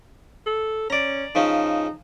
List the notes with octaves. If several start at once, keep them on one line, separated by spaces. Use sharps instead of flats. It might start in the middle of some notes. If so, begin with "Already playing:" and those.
A4
C#4 D5 A#5
C#3 F3 C#4 D#4